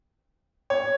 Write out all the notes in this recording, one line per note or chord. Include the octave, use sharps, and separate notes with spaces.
C#5